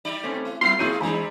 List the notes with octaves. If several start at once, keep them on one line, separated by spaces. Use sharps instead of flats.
G3 D#4 D5
A3 C4 C#4
E4
G3 A#3 C4 E4 F4 C6 C7
F3 A#3 E4 F4 G#4 C#5 G6 D#7
C3 E3 G3 G#3 D4 G#5 B5